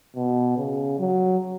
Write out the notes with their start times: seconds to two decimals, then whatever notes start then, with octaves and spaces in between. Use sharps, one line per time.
0.16 B2
0.58 C#3
0.99 F#3